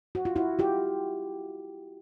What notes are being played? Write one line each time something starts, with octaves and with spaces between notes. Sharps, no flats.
F#4
F4
E4 F#4
F4 G4